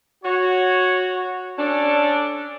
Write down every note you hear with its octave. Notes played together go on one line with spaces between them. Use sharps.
F#4 C#5
C#4 D4 A4